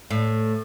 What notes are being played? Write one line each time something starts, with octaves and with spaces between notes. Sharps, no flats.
A2